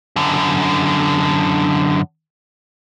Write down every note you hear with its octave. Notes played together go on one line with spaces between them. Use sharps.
F#2 D3